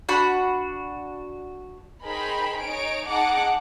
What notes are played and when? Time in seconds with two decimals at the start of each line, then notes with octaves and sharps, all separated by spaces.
0.09 D4 F#4 B5
2.05 D#4 G#4 A#4 C5 G5 B5
2.62 D#4 C#5 G#5 D7
3.07 D#4 G#4 F#5 A5 D6